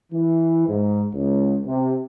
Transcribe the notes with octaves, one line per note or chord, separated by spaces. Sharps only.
E3
G#2
C#2
C3